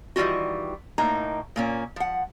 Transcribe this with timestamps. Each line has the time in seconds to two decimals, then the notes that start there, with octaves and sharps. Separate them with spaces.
0.16 D#3 E3 G3 F4 F#4
0.98 A2 A#3 D#4 A#5
1.56 A#2 A#3 C#4
1.96 F3 F#5